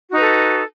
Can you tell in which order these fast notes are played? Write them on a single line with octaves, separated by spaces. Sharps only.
F#4 D#4 B4 A4